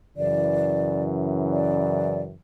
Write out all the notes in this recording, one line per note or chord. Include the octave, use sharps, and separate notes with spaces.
F#2 C#3 E3 D5
D5